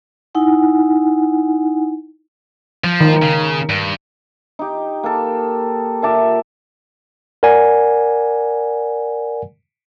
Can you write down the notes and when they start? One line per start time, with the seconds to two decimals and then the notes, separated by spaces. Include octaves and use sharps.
0.35 D#4 E4 F#5 G#5
2.84 F3
3.01 D#3
3.22 C#3
3.69 G2
4.59 D#4 G4
5.03 A#3 A4
6.02 A#2 E5 A5 D6
7.43 A#4 D5 F#5 G#5